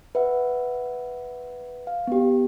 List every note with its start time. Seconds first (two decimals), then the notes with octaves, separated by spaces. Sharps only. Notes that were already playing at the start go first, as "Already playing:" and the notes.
0.15 B4 E5 F#5
1.87 F5
2.07 B3 G4